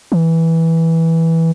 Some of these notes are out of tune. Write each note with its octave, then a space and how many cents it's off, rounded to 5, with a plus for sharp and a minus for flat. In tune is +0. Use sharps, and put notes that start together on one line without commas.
E3 -10